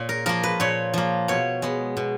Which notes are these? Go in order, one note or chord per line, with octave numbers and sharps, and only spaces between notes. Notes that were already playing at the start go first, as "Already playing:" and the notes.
Already playing: A#2 C#5
A#4
F3 A#3 A#4
B4
A#2 C#5
F3 A#3
B2 C#5
G#3 B3
B2